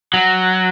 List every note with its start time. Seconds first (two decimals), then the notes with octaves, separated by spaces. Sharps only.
0.14 F#3